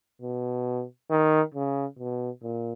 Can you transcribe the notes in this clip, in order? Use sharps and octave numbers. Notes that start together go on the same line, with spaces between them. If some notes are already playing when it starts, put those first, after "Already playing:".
B2
D#3
C#3
B2
A#2